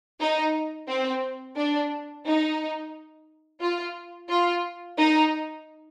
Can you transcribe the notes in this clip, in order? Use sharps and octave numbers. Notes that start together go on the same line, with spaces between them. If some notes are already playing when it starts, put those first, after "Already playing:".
D#4
C4
D4
D#4
F4
F4
D#4